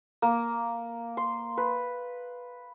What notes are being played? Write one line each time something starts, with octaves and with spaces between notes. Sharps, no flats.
A#3
C6
B4